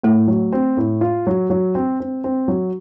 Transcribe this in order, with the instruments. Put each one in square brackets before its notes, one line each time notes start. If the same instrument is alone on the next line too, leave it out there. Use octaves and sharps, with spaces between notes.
[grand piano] A2 [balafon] A3
[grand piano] F#3
C4
A2
F4
F#3
F#3
C4
C4
C4
F#3